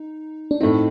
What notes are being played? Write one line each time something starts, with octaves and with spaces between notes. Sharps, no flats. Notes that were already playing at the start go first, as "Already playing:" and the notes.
Already playing: D#4
D4
A2 A3 C4 D#4